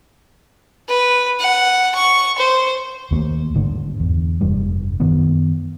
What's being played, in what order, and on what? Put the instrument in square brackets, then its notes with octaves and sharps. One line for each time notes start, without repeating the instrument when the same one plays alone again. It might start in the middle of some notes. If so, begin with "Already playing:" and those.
[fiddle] B4
F#5
C#6
C5
[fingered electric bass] D#2 D#3 A3 A#3
G#1 G2 D3 D4
E2
F1 G2 G3
F#2 D#3 B3